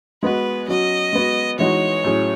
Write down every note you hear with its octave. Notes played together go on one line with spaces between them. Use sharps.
G#3 B3 F#4 B4
F#3 C#4 F#4 D#5
G#3 B3 F#4
E3 G#3 D#4 F#4 C#5
A2 F#3 C#4 G#4